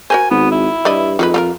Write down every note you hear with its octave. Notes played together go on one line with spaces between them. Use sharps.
F#4 A#4 C5 G#5
G#1 B3
E4
G2 E3 D5 D#5
F2 D#3 G#3 B4
F4 A4 A#4